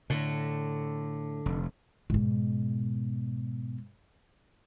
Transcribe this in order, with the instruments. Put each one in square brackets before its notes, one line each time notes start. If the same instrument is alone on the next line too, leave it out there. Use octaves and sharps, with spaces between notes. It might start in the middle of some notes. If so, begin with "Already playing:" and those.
[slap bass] A2 [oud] D3
[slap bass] F1
[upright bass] G#2 B2